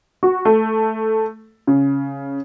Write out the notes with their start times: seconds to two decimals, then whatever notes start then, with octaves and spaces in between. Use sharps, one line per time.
0.23 F#4
0.45 A3
1.67 C#3